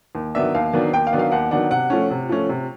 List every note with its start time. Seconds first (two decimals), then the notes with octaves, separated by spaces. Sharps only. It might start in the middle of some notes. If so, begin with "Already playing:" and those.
0.15 D#2
0.35 D#3 F#3 B3 D4 E5
0.55 D#2 F5
0.73 D#3 F#3 B3 D4
0.93 D#2 G5
1.07 F5
1.13 D#3 F#3 B3 D4
1.19 F5
1.32 D#2 F#5
1.51 D#3 F#3 B3 D4 F#5
1.71 C3 F#5
1.90 F3 A3 C#4
2.11 C3
2.29 F3 A3 C#4
2.49 C3